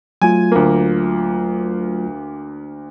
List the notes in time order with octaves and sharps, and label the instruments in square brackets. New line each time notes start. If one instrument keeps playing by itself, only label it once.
[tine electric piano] F#3 A3 F4 [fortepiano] G#5
[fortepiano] D2 A#3